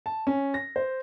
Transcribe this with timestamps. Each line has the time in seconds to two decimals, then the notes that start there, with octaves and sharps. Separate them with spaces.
0.06 A5
0.27 C#4
0.54 A#6
0.76 C5